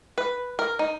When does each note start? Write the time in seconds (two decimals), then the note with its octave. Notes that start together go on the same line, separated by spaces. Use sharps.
0.18 B4
0.59 A#4
0.79 D#4